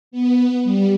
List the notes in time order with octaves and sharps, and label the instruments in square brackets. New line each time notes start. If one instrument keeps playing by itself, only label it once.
[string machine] B3
G3